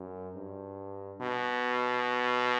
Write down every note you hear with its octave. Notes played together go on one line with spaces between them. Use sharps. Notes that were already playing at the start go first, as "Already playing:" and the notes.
Already playing: F#2
G2
B2